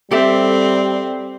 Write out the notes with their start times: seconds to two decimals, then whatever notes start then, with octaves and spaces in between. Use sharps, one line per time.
0.11 G3 C4 G4 A4 E5